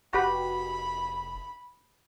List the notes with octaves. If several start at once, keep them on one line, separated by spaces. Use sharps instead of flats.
F1 F#4 G4 B4 B5